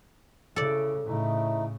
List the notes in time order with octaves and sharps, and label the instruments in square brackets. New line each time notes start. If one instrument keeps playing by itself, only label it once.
[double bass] C#3 [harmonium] E4 [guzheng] A4 D5
[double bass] A2 C#3 [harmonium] A3 D#4 E4